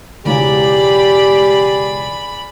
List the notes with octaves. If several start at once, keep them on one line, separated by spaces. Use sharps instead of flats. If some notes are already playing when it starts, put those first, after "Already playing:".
E1 C#2 E3 G4 G#4 D5 B5